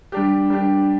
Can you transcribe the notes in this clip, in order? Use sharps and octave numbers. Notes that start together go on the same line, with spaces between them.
G3 D4 G4
G3 D4 G4